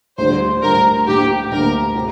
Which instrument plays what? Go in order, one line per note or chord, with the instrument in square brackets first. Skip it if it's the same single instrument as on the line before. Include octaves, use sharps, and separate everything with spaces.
[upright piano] D2 D3 G3 D4 [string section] C5
[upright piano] D2 D3 G3 D4 [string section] A#4
[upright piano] D2 D3 A#3 [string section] G4
[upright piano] D2 D3 A#3 [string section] A#4
[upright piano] C3 G4